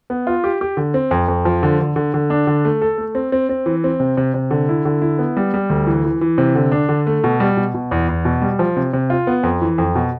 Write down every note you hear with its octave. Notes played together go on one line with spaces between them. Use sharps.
B3
F4
G4
G4
D3
C4
F2
F2
F3
D3
D3
D3
D3
D4
D3
A3
A4
A3
C4
C4
C4
E3
C4
C3
C3
C3
D3
E4
D3
E4
B3
G3
G3
D2
E3
E3
E3
C3
D3
D4
D3
A3
B2
G3
B2
B2
E2
E2
B2
G3
F3
C3
C3
F4
B3
F2
E3
F2
B2